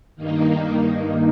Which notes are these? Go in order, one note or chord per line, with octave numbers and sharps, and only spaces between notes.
G2 D#3 A#3 D#4